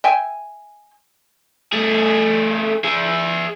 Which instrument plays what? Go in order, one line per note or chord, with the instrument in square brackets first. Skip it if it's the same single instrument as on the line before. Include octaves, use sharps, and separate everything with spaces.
[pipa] E5 G5 G#5
[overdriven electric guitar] A3 G#4
G#4 E5